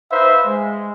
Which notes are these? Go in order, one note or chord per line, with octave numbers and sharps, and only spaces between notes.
D#4 B4 C5 E5 F5
G#3